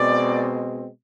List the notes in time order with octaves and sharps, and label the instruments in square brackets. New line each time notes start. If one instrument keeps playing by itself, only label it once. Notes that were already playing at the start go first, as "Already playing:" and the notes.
Already playing: [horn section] B2 G#3 C4 D5